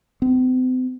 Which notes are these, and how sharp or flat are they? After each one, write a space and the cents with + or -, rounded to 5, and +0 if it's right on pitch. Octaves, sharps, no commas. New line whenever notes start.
C4 -45